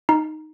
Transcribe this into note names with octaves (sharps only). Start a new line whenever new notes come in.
D#4